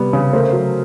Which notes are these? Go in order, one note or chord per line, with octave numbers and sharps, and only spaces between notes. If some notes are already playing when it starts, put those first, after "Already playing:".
Already playing: C3 G3 B3
C#3
A3 A#4 C5
F#3